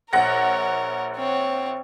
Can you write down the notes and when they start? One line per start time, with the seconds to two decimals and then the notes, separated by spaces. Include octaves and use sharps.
0.13 A#1 A#4 C#5 F#5 A#6
1.16 C4 C#5